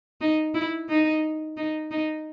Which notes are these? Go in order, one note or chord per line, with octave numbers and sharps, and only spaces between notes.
D#4
E4
D#4
D#4
D#4